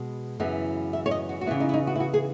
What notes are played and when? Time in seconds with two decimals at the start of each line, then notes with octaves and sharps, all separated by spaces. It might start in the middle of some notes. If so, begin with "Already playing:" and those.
Already playing: B2 G#3 B3
0.40 F#2 C#3 E3 B3
0.93 E5
1.06 C#5
1.11 D#5
1.29 F#4
1.41 F#4
1.47 C#3 E3 B3 E4
1.60 D#4
1.69 E4
1.74 D#4
1.87 F#4
1.96 E4
2.00 F#4
2.14 G#4